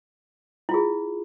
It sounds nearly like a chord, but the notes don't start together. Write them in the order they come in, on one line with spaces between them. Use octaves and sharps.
E4 F4 G#4